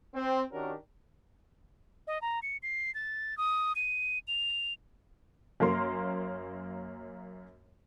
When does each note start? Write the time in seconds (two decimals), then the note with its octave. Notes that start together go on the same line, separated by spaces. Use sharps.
0.14 C4
0.52 D#3 C#4 D4 F#4 G4 A#4
2.07 D#5
2.21 A#5
2.42 C#7
2.63 C7
2.94 A6
3.37 D#6
3.75 D#7
4.27 F7
5.60 F#2 A#3 C#4 A#4 C6